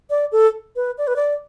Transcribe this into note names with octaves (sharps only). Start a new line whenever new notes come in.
D5
A4
B4
D5
B4
D5